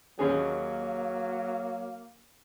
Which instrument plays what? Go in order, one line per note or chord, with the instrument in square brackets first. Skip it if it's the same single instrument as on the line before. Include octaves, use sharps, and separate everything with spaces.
[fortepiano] D#2 C#4 G#4 [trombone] F#3 [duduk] A#3